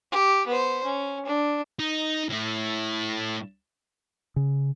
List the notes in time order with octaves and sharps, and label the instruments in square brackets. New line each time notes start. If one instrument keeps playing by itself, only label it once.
[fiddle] G4
B3 C5
C#4
D4
[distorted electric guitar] D#4
A2 E4
[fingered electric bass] C#3